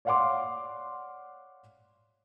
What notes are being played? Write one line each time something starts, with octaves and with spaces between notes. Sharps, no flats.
C#5 D5 F5 F#5 C6 D6